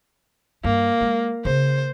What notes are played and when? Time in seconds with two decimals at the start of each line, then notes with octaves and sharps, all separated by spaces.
0.64 G2 A#3
1.01 G#3
1.45 C#3 C5